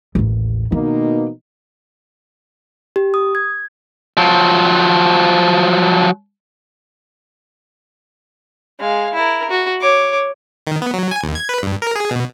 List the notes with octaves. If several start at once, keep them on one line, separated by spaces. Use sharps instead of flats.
A1 D#2
B2 D#3 A#3 D#4
G4
D#6
G#6
F3 F#3
G#3 F5
E4 A#4
F#4
C#5 D6
D#3
B3
F#3
G#5
D#2
G#6
B4
G2
A#4
G#4
B2